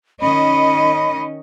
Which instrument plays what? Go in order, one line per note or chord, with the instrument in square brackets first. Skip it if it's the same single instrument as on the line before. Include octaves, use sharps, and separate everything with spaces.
[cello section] D#3 C#4 D#5 [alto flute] B5